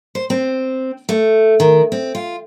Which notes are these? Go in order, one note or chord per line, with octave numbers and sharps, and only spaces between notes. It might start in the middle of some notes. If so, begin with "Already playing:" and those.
C5
C4
A3
D#3
C4
F4